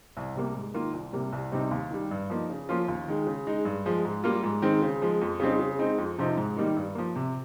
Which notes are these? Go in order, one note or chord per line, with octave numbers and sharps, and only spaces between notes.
C2
C3 G3 A#3
G#2
D#3 A#3 F4
C2
C3 G3 A#3
C2
C3 G3 C4 D#4
D#2
D#3 G3
G2
F3 A#3 D#4
C#3
F3 A#3 C#4 F4
D#2
D#3 G#3
C#3
G#3 D#4
G2
F3 G#3
G#2
G3 A#3 F4
G#2
D#3 G#3 C4
C#3
F3 G#3
F2
C#3 G3 C4 D#4
C#3
G#3 C4 D#4
F2
C3 F3 C4 D#4
G#2
D#3 G3 A#3 D#4
G2
F3 A#3
C3